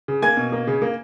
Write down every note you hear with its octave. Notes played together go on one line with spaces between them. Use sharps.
C#3
A#3 G#5 G#6
B2
A#3
C#3
A#3